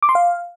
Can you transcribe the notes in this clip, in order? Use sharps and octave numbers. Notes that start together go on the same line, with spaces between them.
D6
C6
F5